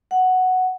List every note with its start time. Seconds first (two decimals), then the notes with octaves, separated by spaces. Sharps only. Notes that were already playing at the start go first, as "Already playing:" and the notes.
0.11 F#5